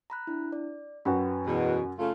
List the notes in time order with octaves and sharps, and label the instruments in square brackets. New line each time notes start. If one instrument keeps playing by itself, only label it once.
[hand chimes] A#5 B5 F#6
D4 E4
D5
[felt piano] F#2 F#4 [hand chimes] B4 G5 B5
[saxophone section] E2 B2
C#3 A3 F4